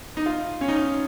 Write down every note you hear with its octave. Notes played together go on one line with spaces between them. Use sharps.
D#4
F4
C#4
D#4